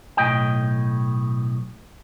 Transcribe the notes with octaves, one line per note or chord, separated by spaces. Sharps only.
B1 A2 D#5 G5